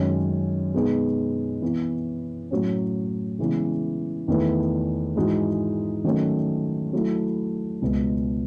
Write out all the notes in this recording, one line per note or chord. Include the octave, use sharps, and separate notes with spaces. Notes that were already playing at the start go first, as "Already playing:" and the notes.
Already playing: F#2 D#3 G#3 C#4
B2 G#3 B3 D#4 G#4
E3 B3 E4
A2 F#3 C#4
C#3 E3 G#3 B3
E2 D#3 A3 E4 B4
G#2 E3 G#3 D#4 F#4
D#3 F#3 A3 C#4
F#3 A3 E4
C#2 B2 G#3 B3